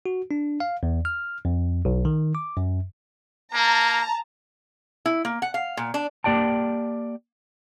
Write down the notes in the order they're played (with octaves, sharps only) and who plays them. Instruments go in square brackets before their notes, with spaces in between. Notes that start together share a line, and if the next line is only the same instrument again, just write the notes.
[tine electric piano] F#4
D4
F5
E2
F6
F2
B1
D#3
D6
F#2
[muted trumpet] A#3 [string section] A5 A#5
[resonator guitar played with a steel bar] E4
A#3
F#5
F5
A#2
D4
[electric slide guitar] A#3 G4 D5 G5 A5